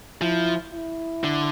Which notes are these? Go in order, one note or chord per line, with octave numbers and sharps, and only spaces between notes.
F3 E4
E4
D3